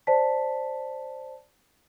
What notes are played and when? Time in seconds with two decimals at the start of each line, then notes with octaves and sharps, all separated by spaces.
0.07 C5 D5 A5 B6